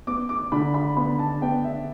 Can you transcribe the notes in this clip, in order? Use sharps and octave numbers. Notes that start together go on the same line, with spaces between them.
B3 D6
D6
D3 B5
B5
B3 B5
A5
B3 G5
E5